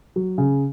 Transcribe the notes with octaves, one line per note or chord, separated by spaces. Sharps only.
F#3
C#3